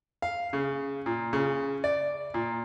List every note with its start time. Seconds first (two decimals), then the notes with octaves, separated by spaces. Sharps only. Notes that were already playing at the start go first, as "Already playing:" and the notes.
0.22 F5
0.53 C#3
1.06 A#2
1.33 C#3
1.84 D5
2.34 A#2